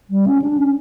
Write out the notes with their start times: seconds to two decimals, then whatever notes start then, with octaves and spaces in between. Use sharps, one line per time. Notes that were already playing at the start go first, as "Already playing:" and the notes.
0.10 G3
0.26 C#4
0.42 D4
0.57 C#4